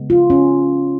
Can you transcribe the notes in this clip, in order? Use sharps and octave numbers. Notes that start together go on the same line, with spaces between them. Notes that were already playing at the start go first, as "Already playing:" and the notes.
Already playing: C#3 G#3 B3
F4
C#4